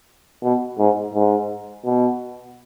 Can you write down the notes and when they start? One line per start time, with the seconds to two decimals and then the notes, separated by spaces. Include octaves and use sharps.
0.43 B2
0.79 G#2
1.14 G#2
1.85 B2